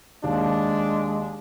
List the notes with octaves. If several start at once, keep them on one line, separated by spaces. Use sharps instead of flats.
D#2 G#3 D4